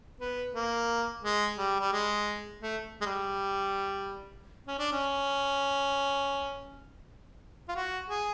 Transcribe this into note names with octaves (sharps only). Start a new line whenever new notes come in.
B3
A#3
G#3
G3
G3
G#3
A3
G#3
G3
C#4
D4
C#4
F4
F#4
G#4